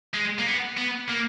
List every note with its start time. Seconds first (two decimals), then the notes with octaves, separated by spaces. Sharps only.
0.14 G#3
0.39 A#3
0.46 B3
0.78 B3
1.10 A#3